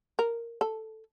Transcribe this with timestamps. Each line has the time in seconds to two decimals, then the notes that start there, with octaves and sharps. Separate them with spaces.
0.19 A#4
0.61 A4